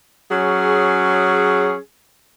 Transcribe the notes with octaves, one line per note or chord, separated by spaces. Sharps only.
F#3 C#4 G#4